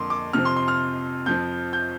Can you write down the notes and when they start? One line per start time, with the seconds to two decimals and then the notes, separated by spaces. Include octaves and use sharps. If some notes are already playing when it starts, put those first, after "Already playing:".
Already playing: F2 D3 A#3 C6 D6
0.10 D6
0.33 F2 C3 F3 C4 F6
0.45 C6
0.56 C6
0.68 F6
1.26 F2 F3 C4 G6
1.73 G6